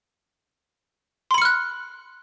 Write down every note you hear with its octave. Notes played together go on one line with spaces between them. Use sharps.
B5 C6 F6 F#6 C#7